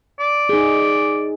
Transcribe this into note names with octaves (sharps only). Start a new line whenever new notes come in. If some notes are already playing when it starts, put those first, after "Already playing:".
D5
D#4 G#4